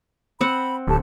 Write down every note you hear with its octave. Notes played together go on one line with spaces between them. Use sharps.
C4 F#5 B5
D1 G4 A4 A5